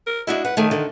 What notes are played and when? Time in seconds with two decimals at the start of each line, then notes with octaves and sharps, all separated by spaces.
0.06 A#4
0.27 D4 E4 F#4 D#5
0.45 B4 F#5
0.57 D#3 A3 G#4
0.71 D3